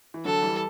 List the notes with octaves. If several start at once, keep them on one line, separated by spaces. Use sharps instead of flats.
E3
D3 F#3 A4
E3 G3